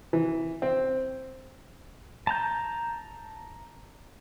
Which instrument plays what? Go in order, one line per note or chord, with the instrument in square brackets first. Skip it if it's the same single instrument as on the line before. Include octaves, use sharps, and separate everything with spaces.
[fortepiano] E3
C4
[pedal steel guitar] A5 A#5 G6